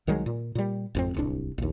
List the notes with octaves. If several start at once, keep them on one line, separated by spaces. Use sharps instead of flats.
C2 D#3 F#3 G#3
A#2
A#2 G3
G#1 F2 C4
D1 C2 D4
A#1 D#2